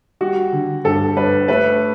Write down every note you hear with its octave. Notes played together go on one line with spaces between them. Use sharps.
G3 F#4
D3
G2 A4
G2 B4
A3 B4